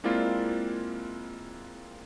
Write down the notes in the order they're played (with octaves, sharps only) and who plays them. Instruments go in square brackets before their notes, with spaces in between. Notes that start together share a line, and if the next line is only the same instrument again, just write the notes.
[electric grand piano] G#3 A#3 C4 E4 F4 D5